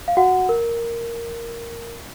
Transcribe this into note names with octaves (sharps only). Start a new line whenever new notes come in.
F5
F#4 F#5
A#4